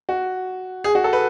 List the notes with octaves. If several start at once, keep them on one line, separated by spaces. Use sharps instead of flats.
F#4
G#4
F#4
A4
B4